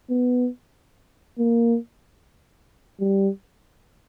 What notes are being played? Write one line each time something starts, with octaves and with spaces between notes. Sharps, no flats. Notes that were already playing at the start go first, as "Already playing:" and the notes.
B3
A#3
G3